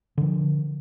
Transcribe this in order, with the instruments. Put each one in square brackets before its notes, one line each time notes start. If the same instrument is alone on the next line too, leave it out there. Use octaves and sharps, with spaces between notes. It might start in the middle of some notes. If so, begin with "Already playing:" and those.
[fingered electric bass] D3 F3